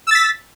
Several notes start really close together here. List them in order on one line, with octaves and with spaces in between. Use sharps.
E6 A6 B6